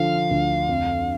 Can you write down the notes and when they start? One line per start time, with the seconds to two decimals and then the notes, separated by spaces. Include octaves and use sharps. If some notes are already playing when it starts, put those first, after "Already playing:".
Already playing: D3 F3 F5
0.31 D2
0.69 F2